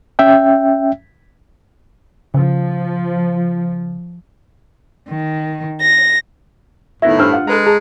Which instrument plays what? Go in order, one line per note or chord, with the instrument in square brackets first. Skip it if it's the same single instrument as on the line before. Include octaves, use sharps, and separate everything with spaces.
[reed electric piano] C#4 E5 G5
[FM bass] C#3 [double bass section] F3
[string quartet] D#3
A#6
[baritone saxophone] A2 [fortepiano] D#3 B3 E4 [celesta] E5 A#6
[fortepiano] G2 C5 E6 [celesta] D4 F6
[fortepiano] F4 F#5
[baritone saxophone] G#3 [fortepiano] A4 B4 A#5
[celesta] G#4 [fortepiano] A5 A#5